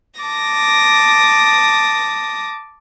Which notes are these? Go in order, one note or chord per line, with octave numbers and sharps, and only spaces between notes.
A5 D6 D#6 A#6